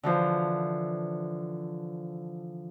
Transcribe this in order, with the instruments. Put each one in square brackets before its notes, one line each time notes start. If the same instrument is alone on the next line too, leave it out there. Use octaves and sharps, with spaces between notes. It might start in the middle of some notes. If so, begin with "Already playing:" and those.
[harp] D3 E3 F3